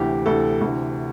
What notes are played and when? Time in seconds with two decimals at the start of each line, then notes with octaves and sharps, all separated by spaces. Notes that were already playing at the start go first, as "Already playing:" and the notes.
Already playing: D2 C3 E3 G4
0.26 D2 C3 E3 A4
0.61 D2 C3 E3